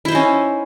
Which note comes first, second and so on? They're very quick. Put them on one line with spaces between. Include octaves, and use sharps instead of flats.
E4 C5 D#4 C#4